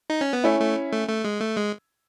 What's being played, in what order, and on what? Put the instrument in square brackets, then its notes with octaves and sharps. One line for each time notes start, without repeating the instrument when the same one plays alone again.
[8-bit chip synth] D#4
C#4
B3
[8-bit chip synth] A3 [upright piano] C#4 E4
[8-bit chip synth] A3
A3
A3
G#3
A3
G#3